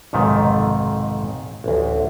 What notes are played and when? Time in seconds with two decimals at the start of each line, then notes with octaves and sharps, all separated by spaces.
0.13 B1 F2 G#2 C3 D#3 A3
1.64 A1 D2